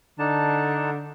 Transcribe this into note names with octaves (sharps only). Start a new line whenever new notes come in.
D3 D4 D#4 A5